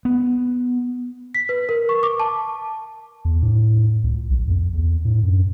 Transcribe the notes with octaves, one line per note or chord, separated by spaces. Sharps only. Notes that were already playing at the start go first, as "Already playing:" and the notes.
B3
B6
B4
A#4
C#6
D6
A5
E2
A2
C#2
A#1
F2
E2
A2
F#2